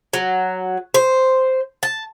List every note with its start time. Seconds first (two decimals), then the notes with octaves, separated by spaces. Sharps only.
0.13 F#3
0.94 C5
1.83 A5